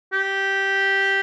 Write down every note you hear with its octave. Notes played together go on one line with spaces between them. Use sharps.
G4